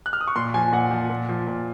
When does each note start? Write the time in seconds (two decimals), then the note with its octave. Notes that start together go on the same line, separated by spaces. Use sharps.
0.06 F#6
0.13 F6
0.21 D#6
0.27 C#6
0.36 A#2 C6
0.54 F3 G#5
0.73 A#2 F#5
0.91 F3
1.10 A#2
1.29 F3
1.47 A#2